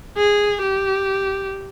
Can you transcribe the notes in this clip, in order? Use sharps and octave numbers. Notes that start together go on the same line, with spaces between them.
G#4
G4